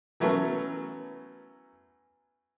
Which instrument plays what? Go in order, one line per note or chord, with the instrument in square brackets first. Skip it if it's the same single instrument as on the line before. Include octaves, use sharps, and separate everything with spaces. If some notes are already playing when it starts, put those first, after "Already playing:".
[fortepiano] E3 F#3 A3 B3 C#4 A#4